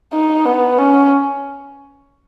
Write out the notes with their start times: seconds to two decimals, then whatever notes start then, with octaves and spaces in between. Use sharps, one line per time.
0.13 D#4
0.45 B3
0.78 C#4